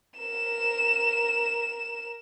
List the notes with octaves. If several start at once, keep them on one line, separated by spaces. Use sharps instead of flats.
A#4 E7